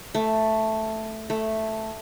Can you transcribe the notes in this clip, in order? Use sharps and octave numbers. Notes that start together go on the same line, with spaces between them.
A3
A3